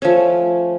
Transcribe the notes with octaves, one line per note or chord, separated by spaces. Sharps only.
F3 A3 C#4